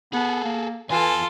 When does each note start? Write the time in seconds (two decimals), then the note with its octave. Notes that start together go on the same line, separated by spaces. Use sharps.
0.13 B3 G#4 A4
0.44 A#3
0.90 E2 E3 F4 A4 G#5